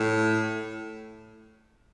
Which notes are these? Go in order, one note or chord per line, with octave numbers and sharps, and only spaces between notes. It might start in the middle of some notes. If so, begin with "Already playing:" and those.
Already playing: A2